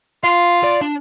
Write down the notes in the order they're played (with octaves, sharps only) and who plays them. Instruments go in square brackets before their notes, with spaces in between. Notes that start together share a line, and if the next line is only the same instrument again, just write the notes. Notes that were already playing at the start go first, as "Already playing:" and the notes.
[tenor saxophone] F4 [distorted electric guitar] F5
[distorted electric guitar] D5
D4